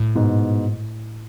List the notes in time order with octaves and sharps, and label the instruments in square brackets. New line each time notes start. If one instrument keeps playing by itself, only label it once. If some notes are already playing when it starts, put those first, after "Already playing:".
Already playing: [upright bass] A2
[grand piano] G#2 B2